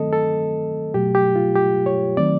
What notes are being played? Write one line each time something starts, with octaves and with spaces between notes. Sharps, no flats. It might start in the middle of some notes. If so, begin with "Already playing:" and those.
Already playing: D#3 F#3 A3 C4 A4 D#5
A4
B2 F#3 A3 G4
G4
F4
G4
C#5
D#3 F#3 A3 C4 D5